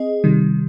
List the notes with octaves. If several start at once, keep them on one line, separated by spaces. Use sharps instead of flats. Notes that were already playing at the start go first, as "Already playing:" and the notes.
Already playing: C4 G#4 D#5
C3 D#3 G3